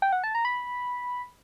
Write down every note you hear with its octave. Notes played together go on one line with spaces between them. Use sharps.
G5
F#5
A5
A#5
B5